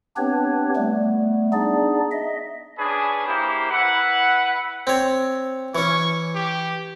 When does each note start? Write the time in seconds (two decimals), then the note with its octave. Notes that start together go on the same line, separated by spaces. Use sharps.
0.17 B3 C4 D4 G4 B4 C#5
0.76 G3 A3 B3
1.53 B3 D4 D#4 G#4 D5
2.12 D#5 E5
2.79 C#4 D4 G#4 B4
3.27 A#3 E4 G4 C5
3.71 E4 B4 F#5
4.87 C4 C#5
5.75 E3 C#4 C#6
6.35 G4